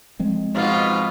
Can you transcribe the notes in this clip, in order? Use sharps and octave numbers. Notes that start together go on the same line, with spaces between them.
F3 G#3 C4
G#2 B2 B3 F4